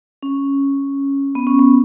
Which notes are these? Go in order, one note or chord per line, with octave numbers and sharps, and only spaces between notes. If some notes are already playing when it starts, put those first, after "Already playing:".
C#4
B3
C#4
B3